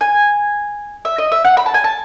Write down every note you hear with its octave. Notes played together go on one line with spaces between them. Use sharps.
G#5
E5
D#5
E5
F#5
B5
A5
G#5
A5